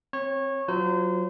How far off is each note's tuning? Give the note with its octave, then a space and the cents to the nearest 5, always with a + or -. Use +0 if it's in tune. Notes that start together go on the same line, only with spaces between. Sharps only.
C4 +15 C#5 -20
F#3 +0 F4 +0 C5 -30